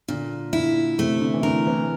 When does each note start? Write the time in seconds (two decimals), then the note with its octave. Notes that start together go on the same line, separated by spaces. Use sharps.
0.08 A#2 D3
0.53 D3 E4
0.98 C3 A3
1.21 D3
1.34 E3
1.43 D3 A#4
1.67 E3